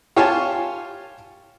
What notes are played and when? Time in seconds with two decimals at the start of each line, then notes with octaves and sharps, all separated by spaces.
0.16 F4 G4 C#5 F5 G#5 A5